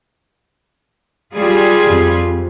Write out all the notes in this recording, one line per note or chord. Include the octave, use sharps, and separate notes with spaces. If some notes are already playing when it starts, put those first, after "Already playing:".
G3 F4 G#4
F2